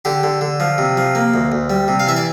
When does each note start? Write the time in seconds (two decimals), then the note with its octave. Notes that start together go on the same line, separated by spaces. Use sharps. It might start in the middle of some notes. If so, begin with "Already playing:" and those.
0.05 D3 G4
0.23 D3
0.41 D3
0.60 F3
0.78 C3
0.97 F3
1.15 A#3
1.34 D2
1.52 D2
1.70 G3
1.88 C3
2.00 F5
2.07 E3 E5
2.16 D5